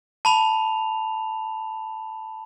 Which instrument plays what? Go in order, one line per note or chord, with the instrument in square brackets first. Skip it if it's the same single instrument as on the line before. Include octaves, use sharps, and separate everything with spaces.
[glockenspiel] A5 B5 F7